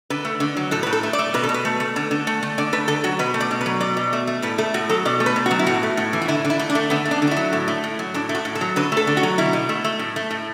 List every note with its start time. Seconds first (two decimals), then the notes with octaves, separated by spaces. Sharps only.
0.10 D3 B4
0.25 A3
0.40 D3
0.57 F#3
0.71 A2 A4
0.83 A2 B4
0.93 A4
1.03 A3
1.13 D5
1.19 A3
1.34 B2 B4
1.43 A4
1.49 B2
1.54 B4
1.65 A3
1.80 A3
1.96 D3
2.11 D3
2.27 A3
2.42 A3
2.58 D3 D5
2.73 A3 B4
2.88 D3 A4
3.04 F#3 F#4
3.19 B2 B4
3.34 A3
3.40 D5
3.51 B2
3.61 B4
3.66 F#3
3.81 B2 D5
3.97 B2
4.13 A3
4.27 A3
4.42 A2 B4
4.58 A3 A4
4.74 A2 F#4
4.89 F#3 A4
5.05 B2 D5
5.20 A3
5.26 B4
5.36 B2
5.46 F#4
5.51 F#3
5.59 E4
5.66 A2 F#4
5.83 A3
5.97 A2
6.13 E3
6.22 F#4
6.28 D3 E4
6.45 D3
6.50 E4
6.59 A3
6.69 D4
6.75 A3
6.90 D3 B3
7.05 A3
7.11 D4
7.22 D3
7.27 F#4
7.31 E4
7.37 F#3
7.53 A2
7.68 A3
7.84 A2
7.99 F#3
8.14 A2 D4
8.29 A3
8.35 F#4
8.45 A2
8.55 A4
8.61 F#3
8.76 D3 B4
8.92 A3 A4
9.07 D3
9.17 F#4
9.23 F#3
9.38 B2 E4
9.53 B2
9.69 A3
9.84 A3
9.99 A2
10.16 A3
10.31 A2